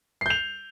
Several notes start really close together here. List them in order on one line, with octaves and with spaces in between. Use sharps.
C7 G6 F7